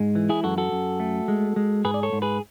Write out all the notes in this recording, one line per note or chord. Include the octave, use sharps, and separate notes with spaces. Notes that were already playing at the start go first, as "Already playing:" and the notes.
Already playing: G#2 G#3
E3
E4 G#4
F#2 F#4 A4
F#4 A4
F#2
A3
G#3
G#3
G#2 G#4 B4
D5
A4 C#5
G#2
G#4 B4